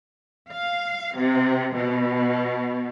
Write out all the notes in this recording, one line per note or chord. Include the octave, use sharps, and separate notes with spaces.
F5
C3
B2